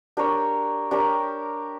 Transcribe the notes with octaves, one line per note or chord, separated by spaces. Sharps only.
D4 G4 A#4 C#5
D4 G4 A#4 C#5